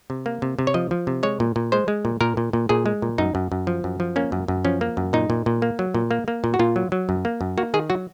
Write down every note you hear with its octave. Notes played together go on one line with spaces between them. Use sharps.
C3
A#3
C3
C3
C#5
F3 D#5
F3
C3
G#3 C#5
A#2
A#2
G#3 C5
G#3
A#2
A#2 A#4
A#2
A#2
A#2 G#4
G#3
A#2
F#2 D#4
F#2
F#2
F3
F#2
F3
A#3 C#4
F#2
F#2
F3 C#4
A#3
F#2
A#2 D#4
A#2
A#2
A#3
F#3
A#2
A#3
A#3
A#2
F#4
A#2 F4
F#3
F#3
F#2
A#3
F#2
A#3 F#4
D#3 G#4
F#3 F#4